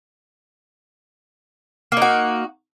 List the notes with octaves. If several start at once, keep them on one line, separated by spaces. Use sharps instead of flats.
A#3 D#4 F#4